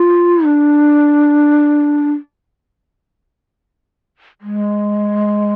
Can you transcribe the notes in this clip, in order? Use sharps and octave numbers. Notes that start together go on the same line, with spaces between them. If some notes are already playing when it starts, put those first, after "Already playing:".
Already playing: F4
D4
G#3